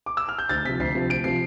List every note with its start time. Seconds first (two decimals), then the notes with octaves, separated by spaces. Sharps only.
0.06 D6
0.17 E6
0.29 F6
0.38 G6
0.49 D2 A6
0.65 C3 F3 B6
0.80 D2 C7
0.95 C3 F3
1.10 D2 D7
1.24 C3 F3 C7